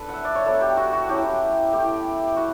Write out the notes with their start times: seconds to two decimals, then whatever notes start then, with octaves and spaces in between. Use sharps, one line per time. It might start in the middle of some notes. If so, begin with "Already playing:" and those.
Already playing: D4 A4 B4
0.09 E5 F#5
0.25 D5
0.35 C#5
0.45 F#3 B3 D4 A4
0.61 G4
0.77 F#4
0.93 F#4
1.09 F#3 C#4 E4 G4
1.72 A3 E4 G4
2.36 A3 E4 F#4